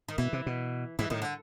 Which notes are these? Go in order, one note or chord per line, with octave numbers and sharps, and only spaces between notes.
D#3
B2 E3
C3
B2
G#2 E3
A2 D#3
D3